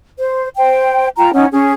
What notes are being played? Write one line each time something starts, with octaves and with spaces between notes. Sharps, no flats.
C5
C5 G5
F4 G5 A#5
C#4 D#4 F#5
C#4 G#4